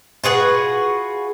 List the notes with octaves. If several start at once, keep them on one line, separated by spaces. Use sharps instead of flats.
F4 F#4 G#4 B4